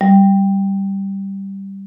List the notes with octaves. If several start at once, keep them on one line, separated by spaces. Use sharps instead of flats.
G3